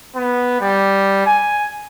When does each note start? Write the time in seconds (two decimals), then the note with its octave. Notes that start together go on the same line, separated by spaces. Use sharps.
0.15 B3
0.61 G3
1.26 G#5